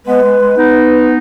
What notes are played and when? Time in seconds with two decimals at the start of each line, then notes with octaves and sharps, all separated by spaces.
0.06 G#3 B3 B4
0.23 G#3
0.40 G#3
0.56 B3 D#4